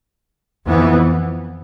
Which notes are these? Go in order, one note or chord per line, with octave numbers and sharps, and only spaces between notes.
F2 E3 B3